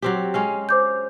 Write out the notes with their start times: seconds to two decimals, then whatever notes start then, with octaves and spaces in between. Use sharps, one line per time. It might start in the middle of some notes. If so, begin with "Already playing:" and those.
0.02 F#3 C4 G4
0.34 G#3 C#4 F5
0.69 C5 D6 G6